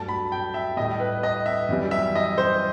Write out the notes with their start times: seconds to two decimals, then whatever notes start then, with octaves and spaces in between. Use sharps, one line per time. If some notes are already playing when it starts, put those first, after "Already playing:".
Already playing: G2 F#3 A3 A5
0.09 B5
0.32 G5
0.54 E5
0.77 A2 G3 D#5
1.00 B4
1.23 D#5
1.46 E5
1.69 F#2 E3 G3
1.91 E5
2.15 D#5
2.38 C5